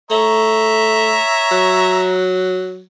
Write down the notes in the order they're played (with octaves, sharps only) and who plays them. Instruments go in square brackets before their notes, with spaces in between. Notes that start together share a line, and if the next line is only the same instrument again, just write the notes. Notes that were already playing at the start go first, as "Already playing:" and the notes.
[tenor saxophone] A3 [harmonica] C#5 E5 A#5
[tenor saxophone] F#3